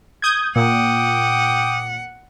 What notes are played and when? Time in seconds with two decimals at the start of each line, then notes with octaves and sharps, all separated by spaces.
0.22 D#6 G6 G#6
0.56 A#2 F#5 G5 D6 D#6